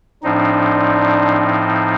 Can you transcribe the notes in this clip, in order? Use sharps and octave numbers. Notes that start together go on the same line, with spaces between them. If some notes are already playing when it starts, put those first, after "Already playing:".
A2 F3 C4 D4 D#4